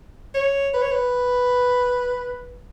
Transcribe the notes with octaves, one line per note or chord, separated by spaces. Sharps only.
C#5
B4
C#5
B4